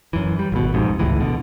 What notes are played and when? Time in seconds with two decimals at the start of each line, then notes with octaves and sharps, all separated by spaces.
0.13 F#2 E3
0.39 G3
0.52 G#1 B2
0.74 B1 F2 G#2 C3
0.99 G1 C#2 A2 E3
1.20 B2 D3